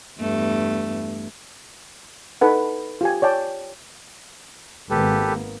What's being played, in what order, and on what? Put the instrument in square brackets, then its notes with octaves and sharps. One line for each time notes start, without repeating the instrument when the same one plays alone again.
[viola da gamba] E2 G2 A3
[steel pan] D#4 A4 B4 F#5
F4 G4 G#5
C#5 D5 G5 A5
[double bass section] G#1 A#3 B3 [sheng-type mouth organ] G4 A4 B4